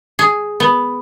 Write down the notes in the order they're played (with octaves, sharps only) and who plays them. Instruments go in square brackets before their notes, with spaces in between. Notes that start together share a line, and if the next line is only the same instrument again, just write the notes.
[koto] G#4
B3